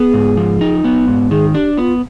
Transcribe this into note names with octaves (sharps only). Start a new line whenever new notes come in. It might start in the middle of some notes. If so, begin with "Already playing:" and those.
Already playing: B3 G#4
G#2
F3
D#4
B3
G#2
D#3 G#4
D4 G4
B3 F4